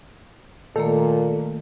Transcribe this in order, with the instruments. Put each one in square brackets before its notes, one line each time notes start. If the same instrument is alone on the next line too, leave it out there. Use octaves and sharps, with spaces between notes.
[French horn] A#2 [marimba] D#3 A3 A#3 [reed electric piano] A4